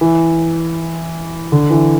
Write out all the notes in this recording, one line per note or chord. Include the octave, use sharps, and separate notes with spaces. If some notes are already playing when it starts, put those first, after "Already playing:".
E3
D3
E3